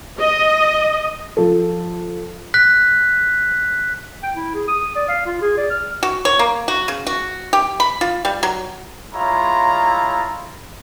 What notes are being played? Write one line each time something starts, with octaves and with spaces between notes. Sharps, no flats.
D#5
F3 A4
F#6 B6
G5
E4
G#4
D#6
D5
F5
F4
G#4
D5
F6
F#4
C#5
A#3
F#4
C#3
F#4
G4
B5
F4
G3
F#3
G#3 E4 F4 C#5 A#5